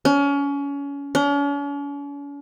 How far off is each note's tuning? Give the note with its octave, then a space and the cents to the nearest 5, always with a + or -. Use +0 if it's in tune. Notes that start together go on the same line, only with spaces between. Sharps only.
C#4 +30
C#4 +45